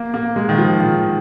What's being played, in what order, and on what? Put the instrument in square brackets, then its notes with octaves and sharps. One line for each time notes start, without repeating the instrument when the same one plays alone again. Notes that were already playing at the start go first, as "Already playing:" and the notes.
Already playing: [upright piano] A#3
A#3
G#3
D#3
F3
D#3